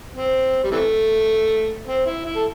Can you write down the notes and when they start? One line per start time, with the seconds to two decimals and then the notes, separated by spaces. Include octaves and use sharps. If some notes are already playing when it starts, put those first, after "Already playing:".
0.15 C4
0.64 G3
0.72 C3 E3 A3
1.87 C4
2.06 E4
2.25 E4
2.35 A4